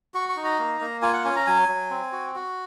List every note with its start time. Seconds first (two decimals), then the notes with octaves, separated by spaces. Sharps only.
0.14 F#4 C#6
0.29 C#6
0.37 D#4
0.45 A#5
0.59 A#3
0.81 A#3
1.02 F4 G#5
1.13 F#5
1.25 C#4 G#5
1.36 A#5
1.47 F#3 G#5
1.69 F#3
1.90 C4
2.12 F#4
2.35 F#4